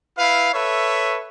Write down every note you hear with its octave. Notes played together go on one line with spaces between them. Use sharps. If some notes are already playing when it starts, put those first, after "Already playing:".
E4 B4 F5
A4 B4 C#5 E5